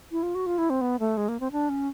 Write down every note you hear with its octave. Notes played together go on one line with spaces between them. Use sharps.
E4
F4
F#4
F4
E4
C4
B3
A3
G#3
A#3
C4
D4
C#4